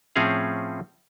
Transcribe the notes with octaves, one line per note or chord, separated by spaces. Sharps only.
A2 F3 C4 C#4 G#4 F5